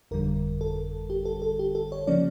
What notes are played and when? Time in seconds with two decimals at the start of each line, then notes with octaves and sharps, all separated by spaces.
0.11 G1 F2 D3 G3 A#4
0.61 A4
1.10 G4
1.25 A4
1.42 A4
1.59 G4
1.75 A4
1.92 C#5
2.07 C#3 F3 A#3 C#4 D5